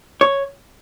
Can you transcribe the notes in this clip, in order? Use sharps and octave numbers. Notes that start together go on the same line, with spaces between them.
C#5